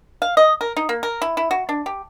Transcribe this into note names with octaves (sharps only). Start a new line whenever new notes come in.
F5
D#5
A#4
D#4
A#3
A#4
E4
E4
F#4
D4
G4